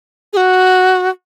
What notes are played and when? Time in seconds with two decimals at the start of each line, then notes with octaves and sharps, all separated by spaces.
0.33 G#4
0.37 F#4